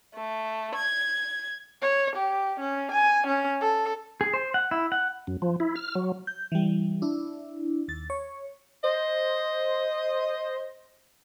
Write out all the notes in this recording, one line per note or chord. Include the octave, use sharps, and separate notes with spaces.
A3
G#6
C#5
G4
C#4
G#5
C#4
A4
G#4
C5
F#5
E4
F#5
F#2
F3
E4
F6
F#3
G6
E3 G3
D4 E4
D#2 A6
C#5
C5 D#5